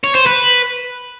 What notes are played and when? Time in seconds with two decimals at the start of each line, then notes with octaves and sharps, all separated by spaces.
0.04 C#5
0.15 C5
0.26 B4